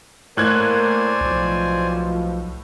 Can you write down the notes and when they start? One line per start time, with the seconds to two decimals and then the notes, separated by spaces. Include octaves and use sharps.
0.37 A2 A#3 A#4 C5 D5 G#5 F#6 G#6
1.21 B1 B2 F3